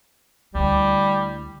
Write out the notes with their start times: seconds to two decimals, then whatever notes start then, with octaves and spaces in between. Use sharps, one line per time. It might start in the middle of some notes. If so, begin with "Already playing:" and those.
0.55 D2 G3 E4